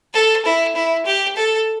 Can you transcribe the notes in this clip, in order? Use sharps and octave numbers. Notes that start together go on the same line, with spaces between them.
A4
E4
E4
G4
A4